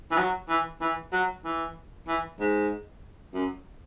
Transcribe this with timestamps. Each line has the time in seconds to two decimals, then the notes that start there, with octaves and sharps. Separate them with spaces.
0.11 E3
0.18 F#3
0.49 E3
0.81 E3
1.13 F#3
1.45 E3
2.08 E3
2.40 G#2
3.34 F#2